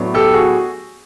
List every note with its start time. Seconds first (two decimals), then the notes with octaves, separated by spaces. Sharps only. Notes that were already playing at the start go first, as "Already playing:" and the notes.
Already playing: A2 F#3 B3 D4
0.14 G4 A4
0.34 F#4 G#4